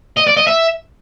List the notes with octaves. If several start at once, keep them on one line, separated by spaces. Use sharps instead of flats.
D#5
D5
D#5
E5